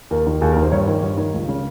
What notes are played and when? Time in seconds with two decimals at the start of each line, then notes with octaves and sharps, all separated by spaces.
0.11 D#2 A#4
0.27 D#3
0.41 D#2 G#4
0.53 D#3 A#4
0.62 C5
0.72 G2 C#5
0.88 D#3
1.03 G2
1.18 D#3
1.34 C#2
1.48 C#3